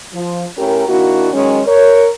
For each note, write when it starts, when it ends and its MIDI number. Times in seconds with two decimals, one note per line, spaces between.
0.14 0.45 53
0.58 0.86 45
0.58 0.86 61
0.58 0.86 67
0.58 0.86 70
0.88 1.29 51
0.88 1.29 58
0.88 1.29 62
0.88 1.29 64
0.88 1.29 66
1.33 1.61 51
1.33 1.61 54
1.33 1.61 56
1.33 1.61 61
1.67 2.08 70
1.67 2.08 73